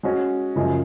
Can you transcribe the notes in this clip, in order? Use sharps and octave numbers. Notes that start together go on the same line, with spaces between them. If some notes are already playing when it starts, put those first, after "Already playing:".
G#3 C#4 F#4
F#2 C#3 F3 G#3